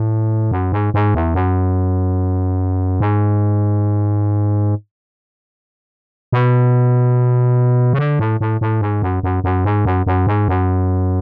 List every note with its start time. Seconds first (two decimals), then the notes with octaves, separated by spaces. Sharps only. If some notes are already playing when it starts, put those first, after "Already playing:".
Already playing: A2
0.52 F#2
0.72 G#2
0.94 G#2
1.15 E2
1.34 F#2
3.00 G#2
6.32 B2
7.93 C#3
7.99 D3
8.19 A2
8.41 A2
8.61 A2
8.81 G#2
9.02 F#2
9.23 F#2
9.44 F#2
9.65 G#2
9.85 F#2
10.06 F#2
10.27 G#2
10.48 F#2